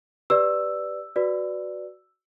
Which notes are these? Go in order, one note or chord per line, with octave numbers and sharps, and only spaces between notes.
G4 B4 D5 E6
F#4 B4 D5